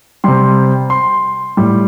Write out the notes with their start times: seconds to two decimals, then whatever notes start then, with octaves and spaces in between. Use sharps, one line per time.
0.24 C3 G3 C6
0.90 C6
1.57 A2 G3